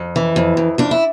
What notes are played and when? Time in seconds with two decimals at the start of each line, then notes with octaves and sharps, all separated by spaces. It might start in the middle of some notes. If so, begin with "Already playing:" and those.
Already playing: F2
0.16 E3
0.36 F2
0.57 F2
0.78 F2 D4
0.91 E4